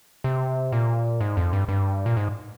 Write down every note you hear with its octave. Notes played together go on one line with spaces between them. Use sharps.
C3
A#2
G#2
F2
G2
G2
A#2
G#2